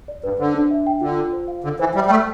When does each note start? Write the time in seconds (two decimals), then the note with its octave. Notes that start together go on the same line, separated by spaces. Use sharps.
0.08 D5
0.24 G2 B4
0.39 D3 C5
0.55 D4
0.71 E5
0.87 G5
1.01 D3 F4
1.17 F4
1.33 C5
1.48 F5
1.64 D3 A4
1.79 E3 C5
1.95 G3 E5
2.06 G3
2.10 A3 A5